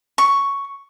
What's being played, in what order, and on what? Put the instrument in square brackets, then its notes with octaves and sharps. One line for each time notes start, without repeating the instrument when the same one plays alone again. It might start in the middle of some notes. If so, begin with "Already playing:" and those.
[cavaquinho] C#6